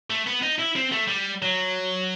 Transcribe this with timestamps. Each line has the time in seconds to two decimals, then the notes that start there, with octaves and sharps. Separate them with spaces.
0.10 A3
0.27 B3
0.42 D#4
0.59 E4
0.76 C4
0.92 A3
1.08 G3
1.42 F#3